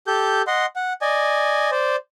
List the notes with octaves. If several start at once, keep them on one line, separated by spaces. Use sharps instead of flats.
G4 A4 G6
D#5 F#5 C6
F#5
D5 D#5 G#5
C5 D5